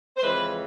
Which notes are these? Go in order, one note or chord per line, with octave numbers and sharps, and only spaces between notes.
C5
F2 C#3 E3 G#3 B4